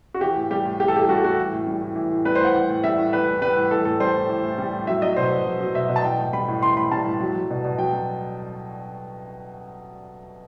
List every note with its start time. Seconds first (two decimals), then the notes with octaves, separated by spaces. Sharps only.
0.14 F#4
0.21 E3 G4
0.36 A2
0.51 G3 G4
0.66 A2
0.80 E3 G4
0.88 A4
0.95 A2 G4
1.08 G3 F#4
1.16 G4
1.23 A2 F#4
1.38 E3
1.53 A2
1.67 G3
1.81 A2
1.96 E3
2.11 A2
2.25 G3 B4
2.35 C5
2.40 A2 F#5
2.54 E3
2.69 A2
2.84 G3 E5
2.98 A2
3.13 E3 B4
3.27 A2
3.42 G3 B4
3.57 A2
3.71 E3 A4
3.85 A2 A4
4.00 G3 C5
4.15 A2
4.29 E3
4.44 A2
4.58 G3
4.73 A2
4.87 F#3 E5
5.02 F#3 D#5
5.16 B2 C5
5.31 B2
5.46 F#3
5.60 F#3
5.75 B2 E5
5.89 B2
5.96 A5
6.04 E3 G5
6.19 A2
6.33 G3 B5
6.48 A2
6.63 E3 C6
6.77 A2 B5
6.92 G3 A5
7.05 A2
7.21 F#3
7.35 F#3
7.50 B2
7.64 B2
7.78 F#3 G5
7.93 F#3